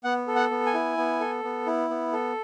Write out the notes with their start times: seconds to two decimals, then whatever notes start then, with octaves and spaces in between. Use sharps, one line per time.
0.04 B3 F#5
0.28 A4
0.35 F#5
0.51 B3
0.66 G#5
0.74 E4
0.97 B3
1.20 A4
1.44 B3
1.66 E4
1.90 B3
2.13 A4